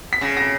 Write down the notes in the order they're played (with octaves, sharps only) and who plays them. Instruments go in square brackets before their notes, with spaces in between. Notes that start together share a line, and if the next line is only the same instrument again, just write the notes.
[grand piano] B6
[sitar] C#3 [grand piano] A#6
[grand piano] A#6